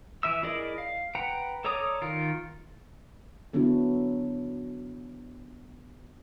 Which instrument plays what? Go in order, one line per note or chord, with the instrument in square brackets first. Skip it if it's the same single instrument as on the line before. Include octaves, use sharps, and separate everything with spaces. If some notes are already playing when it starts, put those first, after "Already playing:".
[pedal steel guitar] E3 E5 E6
E4 G#4 A#4 D5 D#5
F5
B4 F#5 G5 A#5
A4 C#5 D5 A#5 D#6
D#3 F4 A#4
[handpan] D3 F#3 B3 D4 E4 F#4